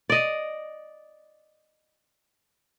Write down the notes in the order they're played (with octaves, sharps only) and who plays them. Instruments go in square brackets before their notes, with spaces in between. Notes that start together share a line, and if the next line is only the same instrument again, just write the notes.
[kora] D5 D#5